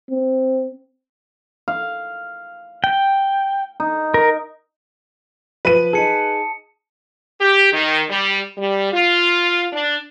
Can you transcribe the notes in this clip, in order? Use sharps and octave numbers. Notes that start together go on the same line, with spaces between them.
C4
F5
G5
D#4
A#4
F3 B4 D#7
D#4 G#4 A5 C#7
G4
D#3
G3
G3
F4
D4